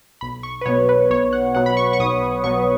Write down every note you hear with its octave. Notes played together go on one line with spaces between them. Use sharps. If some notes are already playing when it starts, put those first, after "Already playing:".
B1 B5
C#6
B4
B2 F#3 B3 C#5
B4
B1 C#5
F#5
B2 F#3 B3 F#5
B5
C#6
C#6
B1 D#6
B2 F#3 B3 C#6